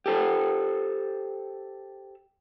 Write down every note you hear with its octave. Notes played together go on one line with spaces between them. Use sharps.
G4 A4 C5